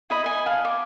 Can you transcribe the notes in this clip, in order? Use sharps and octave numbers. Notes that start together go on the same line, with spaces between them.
E4 D#5 B5
D#5 G#5
F5 A5
D6